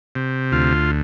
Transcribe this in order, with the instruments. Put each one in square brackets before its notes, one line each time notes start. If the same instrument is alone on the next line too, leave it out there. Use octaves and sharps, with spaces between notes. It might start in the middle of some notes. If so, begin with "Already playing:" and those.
[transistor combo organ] C3
D2 F4